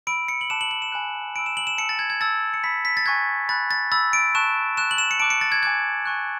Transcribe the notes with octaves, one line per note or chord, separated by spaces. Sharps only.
B5 E6 D7
C#7
F#7
A5 D6 F#6 E7
F#7
F#7
E7
G#5 B5 F#6
G#5 B5 E6 D7
E7
F#7
E7
A5 E6 C#7
A6
G#6
G#6
A5 E6 A6
C#7
B5 E6 B6
B6
A6
G#5 C#6 F#6 G#6
B5 F#6 A6
A6
B5 E6 A6
D7
A5 C#6 F#6 E7
A5 C#6 F#6 E7
F#7
E7
C#7
A5 D6 F#6 D7
C#7
A6
G#6
G#5 D6 F#6 G#6
G#5 C#6 F#6